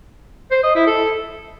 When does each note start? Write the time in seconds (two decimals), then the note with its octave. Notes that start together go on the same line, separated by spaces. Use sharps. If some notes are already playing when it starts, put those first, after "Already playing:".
0.51 C5
0.63 D#5
0.75 E4
0.87 A4